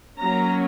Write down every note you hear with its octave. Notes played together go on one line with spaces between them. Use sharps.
F#3 A#3 C#4 A#5